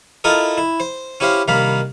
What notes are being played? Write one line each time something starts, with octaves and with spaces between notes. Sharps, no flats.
E4 F4 A4 A#4 D#5
E4
C5
C#4 E4 G4 C5 F5
C2 D#3 A#3 F5 B5